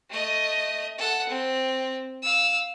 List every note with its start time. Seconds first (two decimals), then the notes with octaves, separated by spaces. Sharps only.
0.10 A3 D#5
0.98 A4 F#5
1.30 C4
2.23 F5 E6